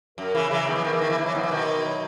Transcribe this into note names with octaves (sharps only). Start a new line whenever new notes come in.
F#2 A#4
C#3 E3 E4
C#3 E3 F#3
D#3 B3
E3
D#3 A#4
E3
D#3 E4
E3
D#3 F#3
E3
D#3 B3
E3
B2 D#3 A#4
E4
F#3